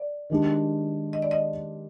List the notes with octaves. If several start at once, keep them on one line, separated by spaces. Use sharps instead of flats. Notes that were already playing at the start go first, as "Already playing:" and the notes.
Already playing: D5
D#3 G#3 D4 G4
D#5
D5
D#5